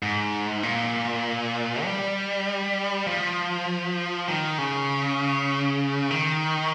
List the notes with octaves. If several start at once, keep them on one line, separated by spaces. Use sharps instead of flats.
G#2
A#2
G3
F3
D#3
C#3
D#3